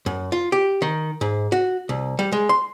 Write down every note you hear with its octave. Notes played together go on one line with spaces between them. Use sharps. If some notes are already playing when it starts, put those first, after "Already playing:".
F#2
F4
G4
D#3
G#2
F#4
C2
G3
G#3
C6